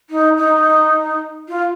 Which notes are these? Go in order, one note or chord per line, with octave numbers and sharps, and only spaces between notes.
D#4
D#4
F4